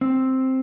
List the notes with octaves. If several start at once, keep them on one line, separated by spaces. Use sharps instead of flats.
C4